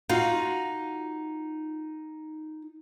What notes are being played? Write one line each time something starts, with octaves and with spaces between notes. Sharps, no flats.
D#4 F4 F#4 F5